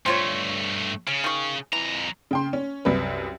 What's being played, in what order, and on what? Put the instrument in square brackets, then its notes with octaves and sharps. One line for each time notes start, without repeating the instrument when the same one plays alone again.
[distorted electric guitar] G2 A3 [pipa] C4 F4 C#5
[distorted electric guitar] C#3 [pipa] C#4
[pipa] D#3 C#6
[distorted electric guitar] F2 A#5 [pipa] E3
[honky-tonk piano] C#3 G5 C6
C#4
C2 F#2 B4